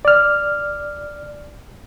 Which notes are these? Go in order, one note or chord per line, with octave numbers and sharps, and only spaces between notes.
D5 F6